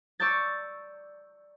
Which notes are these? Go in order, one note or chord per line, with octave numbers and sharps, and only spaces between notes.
D5 C#6 E6 G6 A6